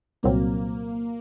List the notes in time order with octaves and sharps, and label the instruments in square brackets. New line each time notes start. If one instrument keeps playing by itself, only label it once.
[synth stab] C2 A#2 F#3 C4 [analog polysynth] A#3